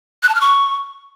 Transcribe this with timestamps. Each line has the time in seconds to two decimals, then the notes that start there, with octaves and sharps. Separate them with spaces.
0.23 F#6
0.29 A5
0.35 F6
0.41 C#6